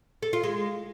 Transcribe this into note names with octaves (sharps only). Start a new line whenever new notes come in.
A4
F4
G#3